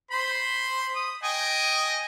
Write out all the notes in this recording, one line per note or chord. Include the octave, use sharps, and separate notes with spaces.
C5 B5 C6
D#6
D#5 G5 G#5